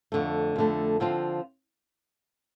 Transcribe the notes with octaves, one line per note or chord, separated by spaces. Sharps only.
F2 D3 A3
F2 D3 A3
D3 F3 C4 F4